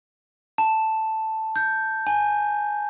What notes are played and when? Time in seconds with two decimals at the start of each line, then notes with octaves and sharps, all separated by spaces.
0.58 A5
1.56 G6
2.07 G#5